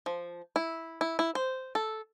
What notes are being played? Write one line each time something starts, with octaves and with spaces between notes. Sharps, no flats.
F3
E4
E4
E4
C5
A4